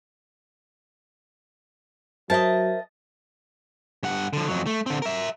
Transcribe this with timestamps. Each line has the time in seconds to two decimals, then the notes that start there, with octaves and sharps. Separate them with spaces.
2.30 F#3 A#4 C5 D#5 E5 A5
4.03 G2 F#5
4.33 D3 F3
4.48 F2 F#3
4.66 A3
4.86 D3 C4
5.02 A#4 E5